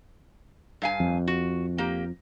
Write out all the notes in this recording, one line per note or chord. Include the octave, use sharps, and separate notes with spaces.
G2 F5 G#5
F2
F#4
A#3 G4